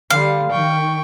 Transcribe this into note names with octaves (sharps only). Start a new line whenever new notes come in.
D3 G3 F5
D#3 G5 C#6